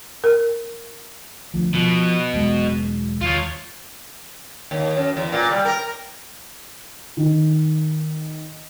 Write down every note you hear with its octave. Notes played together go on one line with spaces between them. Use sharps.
A#4
D2 F3
B2 F3
E1 F#3 G#3
D#2 F4 C#5
D#2
F#2
E2
A#2
G3
A#4
D#3